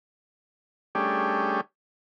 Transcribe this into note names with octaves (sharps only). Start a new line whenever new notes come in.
G3 A3 C#4 D4 G4 G#4